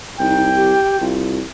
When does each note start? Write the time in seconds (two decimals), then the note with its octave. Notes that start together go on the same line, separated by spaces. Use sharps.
0.20 C2 D#4 G5
0.55 G4
1.01 C2 F4